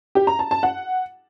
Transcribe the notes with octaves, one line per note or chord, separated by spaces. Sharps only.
G4
A#5
A5
A5
F#5